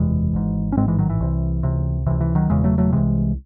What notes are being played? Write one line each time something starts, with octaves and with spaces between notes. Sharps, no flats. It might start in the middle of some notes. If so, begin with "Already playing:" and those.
Already playing: F#1 E2 C3 E3 G#3
G#1 G#2
C#4
A1 G#2 G#3 C4
E3 G#3
D#3 F#3
E3
C2 C3
C#2 C3
C#2 C3 E3
E3
D#3 F#3
E1 E2 C#3 E3 G#3
F#3 A3
F#3 A3
C2 C3 E3 G#3